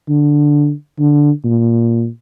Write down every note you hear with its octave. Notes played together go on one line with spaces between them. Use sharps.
D3
D3
A#2